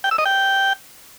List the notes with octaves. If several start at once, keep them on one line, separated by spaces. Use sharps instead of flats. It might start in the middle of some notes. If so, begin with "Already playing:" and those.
G5
E6
D#5
G5